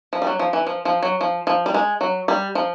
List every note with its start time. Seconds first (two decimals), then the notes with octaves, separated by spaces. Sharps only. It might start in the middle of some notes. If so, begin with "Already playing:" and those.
0.13 F3
0.22 G3
0.27 F#3
0.39 F3
0.53 E3
0.67 F3
0.85 F3
1.03 F#3
1.21 F3
1.47 F3
1.66 G3
1.74 G#3
2.01 F#3
2.28 G3
2.55 F3